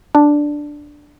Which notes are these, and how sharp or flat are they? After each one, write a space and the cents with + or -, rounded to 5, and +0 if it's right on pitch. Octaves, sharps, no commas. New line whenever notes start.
D4 +0